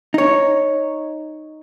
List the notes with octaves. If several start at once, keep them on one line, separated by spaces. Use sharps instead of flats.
D#4 C#5